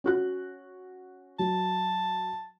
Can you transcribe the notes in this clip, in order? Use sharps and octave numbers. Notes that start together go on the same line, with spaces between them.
C#4 F#4 F#6
F#3 A5